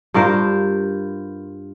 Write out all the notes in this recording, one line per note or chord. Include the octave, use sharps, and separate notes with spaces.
G2 F4 A#4 C5